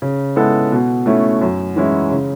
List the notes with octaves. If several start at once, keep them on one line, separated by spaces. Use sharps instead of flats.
C#3
G#3 B3 E4 A4
B2
A3 C#4 E4
F#2
E3 G#3 C#4 E4
C#3